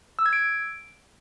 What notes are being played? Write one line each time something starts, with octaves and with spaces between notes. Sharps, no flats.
E6
G#6
D7